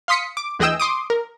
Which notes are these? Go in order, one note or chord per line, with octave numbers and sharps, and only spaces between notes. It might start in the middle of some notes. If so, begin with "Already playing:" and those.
F5 C6 D#6 B6 C#7
D6
D2 E3 G#4 D#5 G5 E6
C6 D6 D#6
A#4